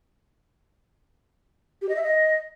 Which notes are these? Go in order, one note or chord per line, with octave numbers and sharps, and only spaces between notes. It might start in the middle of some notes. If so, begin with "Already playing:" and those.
G4
D#5
E5
D#5